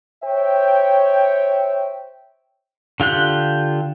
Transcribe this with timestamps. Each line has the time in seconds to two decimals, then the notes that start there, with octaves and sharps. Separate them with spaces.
0.24 C5 C#5 E5 G5
3.00 D3 F4 G4 F#6